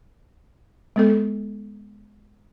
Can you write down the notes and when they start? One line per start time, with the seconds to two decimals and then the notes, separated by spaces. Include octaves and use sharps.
0.96 G#3 B3 A4